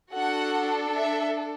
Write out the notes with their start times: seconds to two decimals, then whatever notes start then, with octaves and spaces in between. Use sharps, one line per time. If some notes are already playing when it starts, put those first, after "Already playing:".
0.12 D4 F#4 A4 F#5
0.96 E5